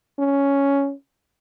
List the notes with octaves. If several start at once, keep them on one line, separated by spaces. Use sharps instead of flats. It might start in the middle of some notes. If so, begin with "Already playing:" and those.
C#4